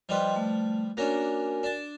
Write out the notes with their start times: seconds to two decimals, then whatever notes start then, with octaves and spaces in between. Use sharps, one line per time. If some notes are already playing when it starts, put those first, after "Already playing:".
0.09 F3 G3 B4 D#5 G5 C6
0.36 A3
0.97 A#3 C#4 D4 F#4 A#4 G#5
1.63 D4 A5